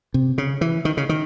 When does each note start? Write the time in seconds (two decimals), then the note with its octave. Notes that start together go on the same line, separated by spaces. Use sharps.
0.14 C3
0.38 C#3
0.61 E3
0.85 D#3
0.97 C#3
1.09 D#3